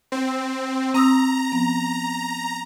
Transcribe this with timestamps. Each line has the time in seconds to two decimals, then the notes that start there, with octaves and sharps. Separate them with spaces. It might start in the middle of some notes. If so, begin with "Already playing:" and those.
0.12 C4
0.94 C4 A#5 D#6 E6
1.52 F3 B3